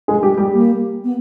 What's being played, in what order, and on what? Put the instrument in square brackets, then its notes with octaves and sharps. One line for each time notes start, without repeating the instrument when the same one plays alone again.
[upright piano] G#3 G#4
G3 G4
G3 G4
[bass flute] A#3
B3